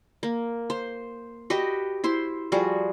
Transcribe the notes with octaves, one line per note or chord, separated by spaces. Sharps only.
A#3
C5
F#4 G4 B4 D#5
E4 C5 C6
F3 G3 F#4 G#4